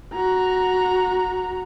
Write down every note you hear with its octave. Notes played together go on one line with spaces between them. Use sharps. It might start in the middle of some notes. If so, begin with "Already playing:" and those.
F#4 A#5